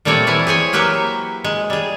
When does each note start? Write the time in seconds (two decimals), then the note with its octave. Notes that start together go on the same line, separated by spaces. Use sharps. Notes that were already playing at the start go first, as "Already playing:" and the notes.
0.05 A#2 G3 A3 C4 C#5 D5
0.27 E3 E4 G#5
0.47 G#4 C5 C#5 G#5
0.73 F#3 A#3 G4 B4 C5 E5
1.44 G#3
1.70 G3 G#4